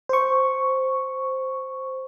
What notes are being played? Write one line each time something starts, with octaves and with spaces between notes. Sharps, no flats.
C5 C#6